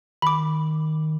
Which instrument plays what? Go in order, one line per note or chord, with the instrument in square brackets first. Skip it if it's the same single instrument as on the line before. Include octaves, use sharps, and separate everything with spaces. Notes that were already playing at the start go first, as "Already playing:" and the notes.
[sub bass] D#3 [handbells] B5 D6